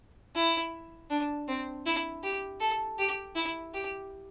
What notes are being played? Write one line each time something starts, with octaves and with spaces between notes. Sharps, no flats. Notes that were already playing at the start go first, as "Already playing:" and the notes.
E4
D4
C4
E4
G4
A4
G4
E4
G4